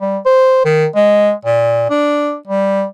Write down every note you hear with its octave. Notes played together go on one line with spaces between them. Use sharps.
G3
C5
D#3
G#3
A#2
D4
G3